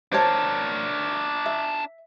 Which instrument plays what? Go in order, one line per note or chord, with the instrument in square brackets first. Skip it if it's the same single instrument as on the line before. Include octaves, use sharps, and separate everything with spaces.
[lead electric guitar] D4 A#4 [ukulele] C5 C#5 A5
[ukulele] E5